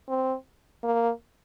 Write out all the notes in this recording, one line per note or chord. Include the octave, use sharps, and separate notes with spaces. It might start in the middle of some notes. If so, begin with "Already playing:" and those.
C4
A#3